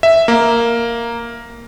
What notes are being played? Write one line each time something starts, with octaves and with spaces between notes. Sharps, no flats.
E5
A#3